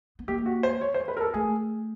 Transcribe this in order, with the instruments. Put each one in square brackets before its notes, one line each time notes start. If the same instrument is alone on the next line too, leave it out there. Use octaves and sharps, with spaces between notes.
[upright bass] B3
[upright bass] A#3 [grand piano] G4
[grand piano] F#4
C5
C#5
C5
B4
A#4
A4
[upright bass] A3 [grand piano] G#4